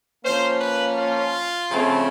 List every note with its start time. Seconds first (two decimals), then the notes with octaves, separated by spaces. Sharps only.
0.24 F3 A#3 C#4 C5
0.60 B4
0.97 F4
1.70 C#3 F3 A3 C4